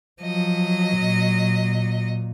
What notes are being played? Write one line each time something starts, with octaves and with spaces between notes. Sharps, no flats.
F3 F#3 D#5
A#2